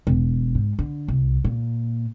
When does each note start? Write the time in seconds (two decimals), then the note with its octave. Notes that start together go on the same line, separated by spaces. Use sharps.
0.07 E1
0.55 G#2
0.79 D3
1.08 C2
1.45 A#2